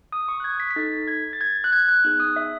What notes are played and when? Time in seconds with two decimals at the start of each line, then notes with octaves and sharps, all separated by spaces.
0.12 D#6
0.28 C#6
0.40 F#6
0.44 G#6
0.60 B6
0.71 B6
0.76 D#4 A4 A6
1.08 G#6
1.33 A6
1.41 G#6
1.64 F#6
1.73 G#6
1.88 F#6
2.04 B3 D#4 G#4 F#6
2.20 D#6
2.36 E5